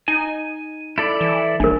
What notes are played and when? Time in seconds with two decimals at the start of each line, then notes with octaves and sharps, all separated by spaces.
0.08 D#4 G#5
0.98 E4 A4 D5
1.21 E3
1.60 G#1 D4 A#4